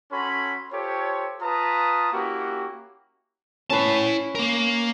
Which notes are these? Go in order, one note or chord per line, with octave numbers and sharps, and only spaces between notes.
C#4 F#4 A4 C#5 B5 C6
F4 G4 A4 C5 C#5
F4 B4 A5 A#5 D#6
A#3 C#4 E4 F#4 G4
C#4 E4 B4 A5
A#3 A#4